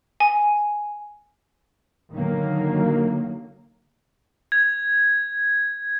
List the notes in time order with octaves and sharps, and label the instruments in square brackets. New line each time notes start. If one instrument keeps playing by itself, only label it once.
[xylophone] G#5
[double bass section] D3 D#3 F#3 A#3
[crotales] G#6